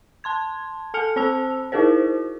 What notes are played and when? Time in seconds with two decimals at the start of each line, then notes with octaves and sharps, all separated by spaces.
0.24 A5 C6 G#6
0.94 A4 G#5 A5 F6 C#7 F7
1.16 C4 C5 A5 E6 F7
1.72 D#4 E4 F#4 G#4 A#4 C5